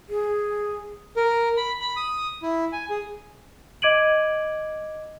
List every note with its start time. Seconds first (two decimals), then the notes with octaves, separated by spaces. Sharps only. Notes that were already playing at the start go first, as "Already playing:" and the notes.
0.09 G#4
1.16 A#4
1.57 B5
1.81 B5
1.96 D#6
2.42 E4
2.72 G#5
2.90 G#4
3.82 D#5 D6 G#6 D7 D#7 F#7